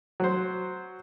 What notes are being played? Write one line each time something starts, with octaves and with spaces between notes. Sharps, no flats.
F#3 C5